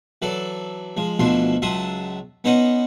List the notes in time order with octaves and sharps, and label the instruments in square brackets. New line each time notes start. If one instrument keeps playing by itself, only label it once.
[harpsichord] E3 F#3 A4 D5
F3 G#3
D2 B2 E3 F3 D4 C6
C#2 F#3 E5 A5 C6 D#6
B3 C#4 D#4 C5 D#5 F#5